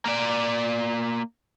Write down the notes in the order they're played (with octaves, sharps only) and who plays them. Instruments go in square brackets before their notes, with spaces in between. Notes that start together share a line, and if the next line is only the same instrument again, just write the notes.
[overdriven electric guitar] A#3 D5